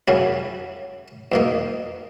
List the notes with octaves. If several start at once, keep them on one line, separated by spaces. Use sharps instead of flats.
F#2 C#3 F#3 C#4 E4
E2 B2 A#3 D#4